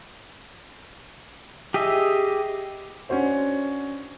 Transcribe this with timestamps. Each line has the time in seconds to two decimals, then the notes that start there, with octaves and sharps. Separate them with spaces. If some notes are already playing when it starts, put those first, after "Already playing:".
1.74 G4 G#4 D#5 E5
3.09 C#4 D4 F#4 C5 C#5